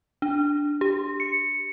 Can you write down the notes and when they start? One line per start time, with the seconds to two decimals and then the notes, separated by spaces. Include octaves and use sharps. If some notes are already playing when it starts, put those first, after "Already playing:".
0.22 D4
0.81 G4
1.20 C#7